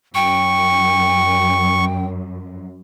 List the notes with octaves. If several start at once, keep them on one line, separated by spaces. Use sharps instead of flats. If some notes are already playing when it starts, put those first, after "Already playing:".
F#2 G5 C#6